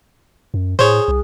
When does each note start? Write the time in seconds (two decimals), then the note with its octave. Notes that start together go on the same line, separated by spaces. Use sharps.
0.54 F#2
0.79 A2 G#4 C5 C#5
1.08 C2